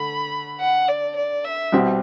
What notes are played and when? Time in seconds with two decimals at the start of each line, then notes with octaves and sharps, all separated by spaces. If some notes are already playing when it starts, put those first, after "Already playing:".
Already playing: D3 A3 B5
0.60 F#5
0.88 D5
1.16 D5
1.45 E5
1.72 C2 B2 G3 C4 G4